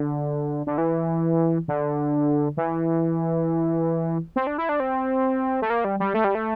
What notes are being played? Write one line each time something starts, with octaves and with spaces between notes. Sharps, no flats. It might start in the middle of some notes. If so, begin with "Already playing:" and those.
Already playing: D3
D3
E3
D3
E3
C4
D4
E4
D4
C4
A3
A#3
G3
G3
A3
G3
A3